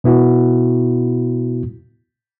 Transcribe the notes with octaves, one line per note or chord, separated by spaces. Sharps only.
B2 B3 E4 F#4